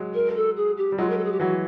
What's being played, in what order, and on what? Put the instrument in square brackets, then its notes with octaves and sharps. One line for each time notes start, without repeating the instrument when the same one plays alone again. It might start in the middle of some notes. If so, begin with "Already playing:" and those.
Already playing: [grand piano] F#3 G#3
[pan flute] A#4
A4
G#4
G4
[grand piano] G3
[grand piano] F#3 G#3 [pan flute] F4
[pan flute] A#4
A4
G#4
G4
[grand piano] E3 F#3 [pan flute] F#4